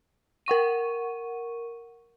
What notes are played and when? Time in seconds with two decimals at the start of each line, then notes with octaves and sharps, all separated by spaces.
0.46 A#4 F#5 C#6 D#7